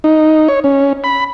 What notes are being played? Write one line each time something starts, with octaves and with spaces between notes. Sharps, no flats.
D#4
C#5
C#4
B5